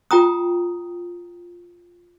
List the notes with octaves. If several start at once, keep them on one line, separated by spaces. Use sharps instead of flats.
F4 G5 A#5 D#6